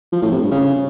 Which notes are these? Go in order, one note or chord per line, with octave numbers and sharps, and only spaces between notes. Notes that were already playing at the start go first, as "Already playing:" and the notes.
F3
A2
C3
G2
C#3